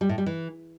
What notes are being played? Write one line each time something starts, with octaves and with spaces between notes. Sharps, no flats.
G3
A2
G3
E3